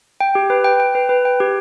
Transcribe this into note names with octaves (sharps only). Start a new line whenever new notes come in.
G5
G4
B4
G5
G5
B4
B4
G5
G4